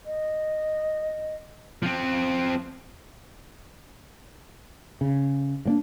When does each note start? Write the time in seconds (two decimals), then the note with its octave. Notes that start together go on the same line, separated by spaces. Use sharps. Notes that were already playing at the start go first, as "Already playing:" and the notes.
0.06 D#5
1.83 F3 C4
5.01 C#3
5.65 G2 A#3 D4